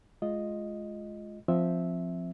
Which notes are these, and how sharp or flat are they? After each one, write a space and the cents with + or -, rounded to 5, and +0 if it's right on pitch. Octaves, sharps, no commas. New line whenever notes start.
G#3 +25 F4 +0 D#5 +0
F3 +0 C4 +0 E5 -10